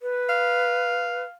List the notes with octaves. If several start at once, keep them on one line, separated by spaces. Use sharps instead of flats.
B4
F5